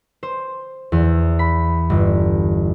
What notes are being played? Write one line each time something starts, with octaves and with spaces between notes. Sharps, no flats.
C5
E2
B5
G1